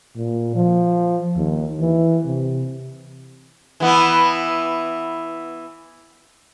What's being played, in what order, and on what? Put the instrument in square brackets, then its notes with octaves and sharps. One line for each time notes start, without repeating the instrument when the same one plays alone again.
[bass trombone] A#2
F3
D#2
E3
C3
[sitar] E3 B3 E4